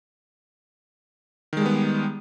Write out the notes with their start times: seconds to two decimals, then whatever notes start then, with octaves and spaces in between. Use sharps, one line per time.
1.53 D#3
1.57 G#3
1.61 G3
1.65 B3